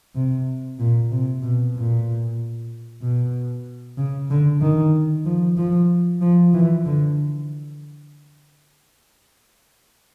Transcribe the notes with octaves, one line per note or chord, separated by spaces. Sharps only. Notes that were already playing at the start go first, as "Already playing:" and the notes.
C3
A#2
C3
B2
A#2
B2
C#3
D3
D#3
F3
F3
F3
E3
D3